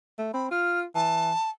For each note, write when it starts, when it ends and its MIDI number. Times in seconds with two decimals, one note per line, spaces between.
0.18 0.31 57
0.34 0.50 60
0.34 0.50 83
0.51 0.85 65
0.51 0.79 89
0.95 1.32 52
0.95 1.50 81